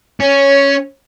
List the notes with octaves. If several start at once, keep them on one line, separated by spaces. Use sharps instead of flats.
C#4 C#5